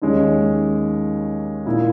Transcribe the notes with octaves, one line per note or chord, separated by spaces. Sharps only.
D#2 D#3 G#3 C#4
A#2 A#3 E4